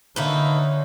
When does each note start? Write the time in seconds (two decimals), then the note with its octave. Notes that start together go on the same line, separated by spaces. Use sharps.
0.16 D3 A#3 D#4 B4 C#5 E5 F#5